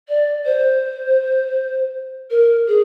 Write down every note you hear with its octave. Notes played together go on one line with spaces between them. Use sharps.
D5
C5
A#4
G#4